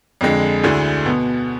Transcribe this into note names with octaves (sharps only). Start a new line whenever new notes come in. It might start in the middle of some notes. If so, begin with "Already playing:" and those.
F2 D3 G#3
D2 D3 A3 E4 G#4
B2 B3